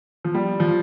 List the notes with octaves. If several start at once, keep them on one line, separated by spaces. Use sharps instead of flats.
F3
G3
F3